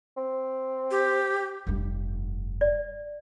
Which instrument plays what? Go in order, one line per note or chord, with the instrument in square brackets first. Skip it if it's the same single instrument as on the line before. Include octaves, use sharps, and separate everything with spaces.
[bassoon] C4
[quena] G4
[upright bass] F1 G2
[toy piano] D5